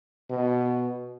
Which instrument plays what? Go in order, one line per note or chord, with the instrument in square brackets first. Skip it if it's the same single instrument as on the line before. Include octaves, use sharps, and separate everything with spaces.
[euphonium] B2